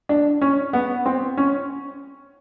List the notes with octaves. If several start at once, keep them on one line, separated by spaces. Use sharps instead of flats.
D4
C#4
B3
C4
C#4